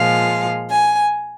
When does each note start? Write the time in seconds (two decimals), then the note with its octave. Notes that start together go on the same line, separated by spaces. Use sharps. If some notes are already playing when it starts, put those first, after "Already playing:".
Already playing: A#2 F3 G#3 F5
0.71 G#5